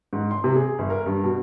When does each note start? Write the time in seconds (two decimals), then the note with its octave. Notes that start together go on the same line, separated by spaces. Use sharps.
0.13 G#2
0.31 C6
0.44 C3
0.55 G#4
0.79 G1
0.90 A#4
1.06 G2
1.24 B2